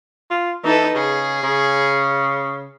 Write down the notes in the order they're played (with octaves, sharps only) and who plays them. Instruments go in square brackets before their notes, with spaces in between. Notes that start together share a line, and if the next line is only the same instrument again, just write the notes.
[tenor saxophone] F4
[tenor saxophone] E3 [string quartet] D#4 A4 B4
[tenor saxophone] C#3 [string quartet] G#4
[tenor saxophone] C#3